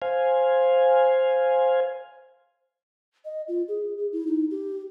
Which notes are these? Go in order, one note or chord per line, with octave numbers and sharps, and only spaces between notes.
C5 F5 G#5
D#5
F4
G#4
G#4
E4
D#4
G4